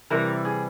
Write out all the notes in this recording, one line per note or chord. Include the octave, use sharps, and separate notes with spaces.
C3 E3 G3 A#4
G#4